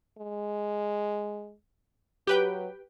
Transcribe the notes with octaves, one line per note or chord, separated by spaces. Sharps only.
G#3
F#3 G4 B4 G5